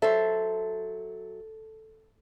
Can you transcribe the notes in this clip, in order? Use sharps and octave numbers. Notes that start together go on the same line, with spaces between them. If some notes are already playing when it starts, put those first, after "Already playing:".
F#3 A4 C5 E5